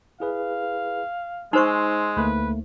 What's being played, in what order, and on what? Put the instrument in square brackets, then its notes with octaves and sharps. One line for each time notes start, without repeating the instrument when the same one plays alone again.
[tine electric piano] E4 G#4 B4 [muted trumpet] F5
[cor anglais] G#3 [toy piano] D#4 C5 C#6 [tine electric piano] C6 E6
[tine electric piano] D2 A3 A#3 [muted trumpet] B4